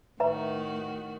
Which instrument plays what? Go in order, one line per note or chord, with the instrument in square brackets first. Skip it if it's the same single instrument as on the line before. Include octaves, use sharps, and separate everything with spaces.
[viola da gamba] A2 D#3 F#4 [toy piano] B4 E5 A#5